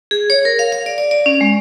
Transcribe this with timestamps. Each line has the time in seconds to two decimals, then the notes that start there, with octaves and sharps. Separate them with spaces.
0.11 G#4
0.30 C#5
0.45 A#4
0.59 F5
0.72 F5
0.86 D5
0.98 D5
1.11 D5
1.26 C#4
1.41 G#3